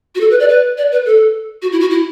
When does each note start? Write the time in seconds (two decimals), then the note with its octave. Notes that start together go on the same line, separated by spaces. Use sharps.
0.15 F#4
0.20 A4
0.31 B4
0.40 D5
0.49 B4
0.78 D5
0.92 B4
1.06 A4
1.62 F#4
1.72 E4
1.81 F#4
1.91 E4